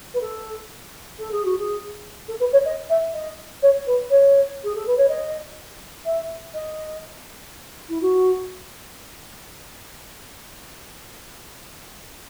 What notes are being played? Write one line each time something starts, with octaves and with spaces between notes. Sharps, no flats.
B4
A4
A4
G#4
F#4
G#4
A4
B4
C#5
D#5
E5
D#5
C#5
B4
C#5
G#4
A4
B4
C#5
D#5
E5
D#5
E4
F#4